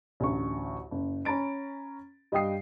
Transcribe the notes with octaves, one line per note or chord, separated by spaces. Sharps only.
A1 D2 C#6
F#1
C#4 A#5 B5 A6 D7
G2 D#5 F5 G5 D#6 C7